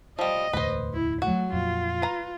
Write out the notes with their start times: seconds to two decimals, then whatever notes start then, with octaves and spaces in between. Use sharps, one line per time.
0.19 F3 G3 D#5
0.53 E1 D2 A2 B4 C5
0.93 E4
1.22 F#3 A3 F#4
1.53 F2 A#2 F4
2.02 B4 A#5